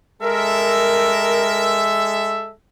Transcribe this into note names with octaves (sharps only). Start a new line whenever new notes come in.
G#3 A4 A#4 E5